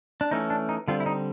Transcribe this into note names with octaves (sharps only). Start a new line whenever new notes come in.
D4
E3 A3 C#4 D#4
D4
D#4
D3 G3 C4 F4
E4
D#4